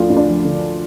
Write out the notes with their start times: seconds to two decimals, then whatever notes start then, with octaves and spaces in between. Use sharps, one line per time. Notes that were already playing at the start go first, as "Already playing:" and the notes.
Already playing: D2 D3 F3 D4 F4
0.10 D2
0.17 D4
0.28 F3
0.44 D3